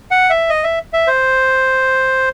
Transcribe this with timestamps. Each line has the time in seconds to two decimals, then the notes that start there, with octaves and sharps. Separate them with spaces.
0.11 F#5
0.30 E5
0.50 D#5
0.64 E5
0.93 E5
1.07 C5